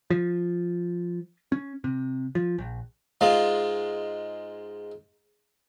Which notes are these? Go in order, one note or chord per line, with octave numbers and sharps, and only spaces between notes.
F3
C#4
C3
F3
A#1
G#2 G#3 F4